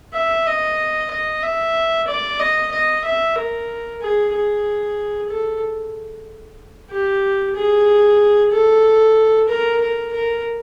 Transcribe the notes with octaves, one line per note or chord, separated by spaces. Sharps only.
E5
D#5
D#5
E5
D5
D#5
D#5
E5
A#4
G#4
G#4
A4
G4
G#4
A4
A#4
A#4
A#4